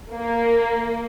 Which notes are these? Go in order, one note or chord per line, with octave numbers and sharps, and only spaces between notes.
A#3